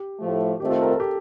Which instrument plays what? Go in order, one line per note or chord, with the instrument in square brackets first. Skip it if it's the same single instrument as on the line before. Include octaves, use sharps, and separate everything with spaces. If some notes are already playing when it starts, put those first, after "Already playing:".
Already playing: [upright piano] G4
[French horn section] A2 F3 A3
[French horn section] D#3 A3 C4 F4 [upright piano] G4
[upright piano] A4
A#4
A4
G4